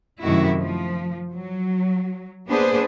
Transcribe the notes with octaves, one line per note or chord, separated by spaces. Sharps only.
F#2 C3 D#3 A3 E4 F#4
F3
F#3
A#3 B3 D4 G#4 B4 C5